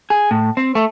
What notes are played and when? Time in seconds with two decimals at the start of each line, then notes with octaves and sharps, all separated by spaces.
0.10 G#4
0.31 A2
0.57 C4
0.75 A3